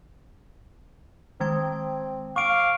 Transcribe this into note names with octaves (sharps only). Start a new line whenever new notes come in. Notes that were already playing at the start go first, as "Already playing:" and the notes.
D#3 G#3 C4 G5
F5 C#6 D6 D7